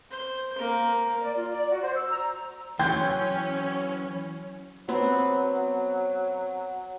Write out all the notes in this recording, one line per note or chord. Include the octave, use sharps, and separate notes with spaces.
C5
A#3
D5
F4
D5
F#4
C5
E6
A#5
E3 F#3 C#4 E4 G5 C6 G6
F#3 B3 C4